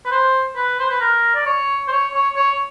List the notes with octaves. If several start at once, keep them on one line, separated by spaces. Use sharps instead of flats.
B4
C5
B4
C5
B4
A#4
D5
C#5
C5
C#5
C#5
C#5